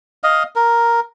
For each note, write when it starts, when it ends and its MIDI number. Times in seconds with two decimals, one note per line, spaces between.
0.24 0.43 75
0.24 0.43 77
0.56 1.00 70